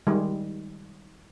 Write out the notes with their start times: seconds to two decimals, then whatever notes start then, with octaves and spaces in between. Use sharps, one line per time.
0.07 D#3 G3 G#3